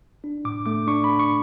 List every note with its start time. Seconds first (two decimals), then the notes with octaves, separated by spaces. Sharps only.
0.24 D4
0.45 A2 D6
0.66 A3 D6
0.87 D4 C#6
1.04 D4 B5
1.19 C#6